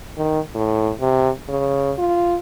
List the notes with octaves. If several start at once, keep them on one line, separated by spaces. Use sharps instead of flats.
D#3
A2
C3
C#3
F4